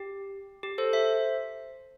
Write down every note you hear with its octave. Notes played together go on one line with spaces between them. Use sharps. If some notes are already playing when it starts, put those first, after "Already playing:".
Already playing: G4
G4
A4 C5
C5 E5